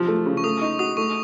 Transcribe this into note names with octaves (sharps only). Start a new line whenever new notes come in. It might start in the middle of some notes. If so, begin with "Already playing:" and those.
Already playing: C3 F3
A3
C#3
C#6
A3 D#6
D#4 C#6
F#4 D#6
A3 C#6